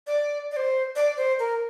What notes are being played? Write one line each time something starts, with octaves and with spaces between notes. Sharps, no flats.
D5
D5
C5
D5
C5
A#4